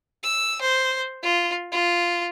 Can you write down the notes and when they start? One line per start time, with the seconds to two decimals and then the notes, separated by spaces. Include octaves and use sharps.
0.23 E6
0.62 C5
1.23 F4
1.72 F4